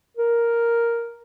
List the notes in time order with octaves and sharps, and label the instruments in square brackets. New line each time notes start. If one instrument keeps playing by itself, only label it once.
[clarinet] A#4